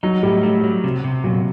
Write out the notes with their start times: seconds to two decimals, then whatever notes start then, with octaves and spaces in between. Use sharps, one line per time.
0.03 F#3 D#4
0.23 A2 G3
0.43 A3
0.64 F#3
0.84 C3
1.04 C3
1.24 A#2 F#3